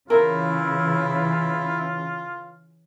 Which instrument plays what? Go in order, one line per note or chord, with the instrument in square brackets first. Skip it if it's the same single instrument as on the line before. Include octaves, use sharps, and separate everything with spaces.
[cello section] C#3 E3 [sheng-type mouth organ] E4 [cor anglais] F4 [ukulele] A#4